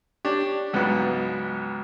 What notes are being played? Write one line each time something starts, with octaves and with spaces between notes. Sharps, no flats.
D4 G4 C#5
C#2 G#2 F#3 B3